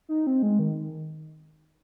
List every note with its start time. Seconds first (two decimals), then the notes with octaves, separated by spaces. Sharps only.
0.09 D#4
0.27 C4
0.43 G#3
0.59 D#3